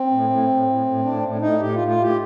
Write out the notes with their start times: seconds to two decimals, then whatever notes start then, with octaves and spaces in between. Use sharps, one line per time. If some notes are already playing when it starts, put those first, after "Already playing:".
Already playing: C4
0.11 A2
0.30 A2
0.49 A2
0.67 A2
0.86 A2
1.04 A2 D4
1.23 A2
1.41 A2 D#4
1.60 A2 G4
1.74 F4
1.79 A2
1.88 F4
1.98 A2 G4